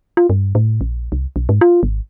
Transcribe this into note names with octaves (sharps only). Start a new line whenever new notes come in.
F4
G2
A2
A#1
C2
B1
G#2
F4
G#1